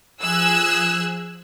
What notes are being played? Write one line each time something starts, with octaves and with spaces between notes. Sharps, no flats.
F3 G#4 E6 F#6 G#6